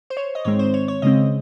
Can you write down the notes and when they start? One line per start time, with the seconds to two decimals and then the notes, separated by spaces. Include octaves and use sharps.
0.10 C5
0.17 C#5
0.35 D#5
0.45 G#2 D#3 G#3 C4 C#5
0.59 C5
0.74 C#5
0.88 C#5
1.02 C#3 G#3 C4 D#5